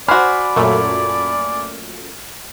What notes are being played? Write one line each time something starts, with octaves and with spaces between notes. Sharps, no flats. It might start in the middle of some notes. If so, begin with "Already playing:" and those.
F#4 C5 D5 G#5 B5 F6
F#2 A#2 A3